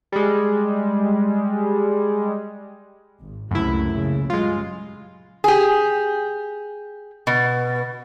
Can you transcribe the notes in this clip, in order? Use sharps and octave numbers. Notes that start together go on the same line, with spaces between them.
G3 G#3
G#1
C#2 F#2 C3 A3 E4
A#1 C#3
F#2 G3 G#3 F4
G4 G#4
B2